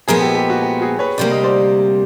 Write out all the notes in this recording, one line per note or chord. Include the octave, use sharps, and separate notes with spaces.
A#2 F3 G#3 B3 G#4 A#4
G4 A4
G4
F#4
G4
F#4 G#4
B4 C#5
D2 C3 D#3 G3 A#3 D5
D#5
C5 D5